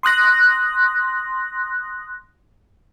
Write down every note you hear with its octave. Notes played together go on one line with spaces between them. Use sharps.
C6 D#6 F#6 A#6